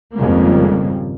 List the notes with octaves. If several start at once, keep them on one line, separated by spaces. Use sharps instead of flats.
G#1 F2 C#3 G3 A#3